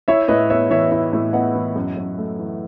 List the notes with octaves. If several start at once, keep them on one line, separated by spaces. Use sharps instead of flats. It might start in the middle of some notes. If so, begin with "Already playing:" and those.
E4 C#5 E5
A2 B4 D#5
B3 C#5 E5
E3 C#5 E5
E4 C#5 E5
A2
B3 D#5 F#5
E3
F#2
F#2
A3
E3